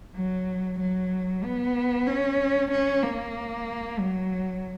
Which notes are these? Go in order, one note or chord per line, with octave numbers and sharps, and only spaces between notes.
F#3
F#3
B3
C#4
C#4
A#3
F#3